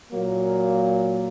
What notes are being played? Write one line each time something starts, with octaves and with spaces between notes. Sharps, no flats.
A#2 F#3 A#3